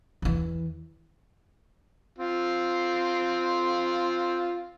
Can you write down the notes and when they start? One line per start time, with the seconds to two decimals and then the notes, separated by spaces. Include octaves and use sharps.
0.22 E2 E3
2.18 C4 F4